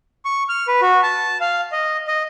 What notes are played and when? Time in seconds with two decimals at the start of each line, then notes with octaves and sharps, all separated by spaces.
0.25 C#6
0.49 F6
0.68 B4
0.81 F#4
1.03 A5
1.41 F5
1.72 D#5
2.08 D#5